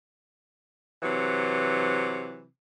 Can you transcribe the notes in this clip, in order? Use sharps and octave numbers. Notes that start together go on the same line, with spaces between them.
C3 E3 F#3